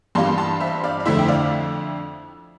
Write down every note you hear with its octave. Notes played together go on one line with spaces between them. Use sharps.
G2 E3 G3 A#3 F4 A5 C6
A5 C6
C5 E5
D5 F5
D5
F2 D3 A3 E4 C5 E5
G5
D5 F5